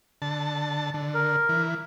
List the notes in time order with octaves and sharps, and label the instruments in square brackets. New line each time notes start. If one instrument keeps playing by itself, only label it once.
[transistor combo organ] D3 A5
D3
[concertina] A#4
[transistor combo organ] E3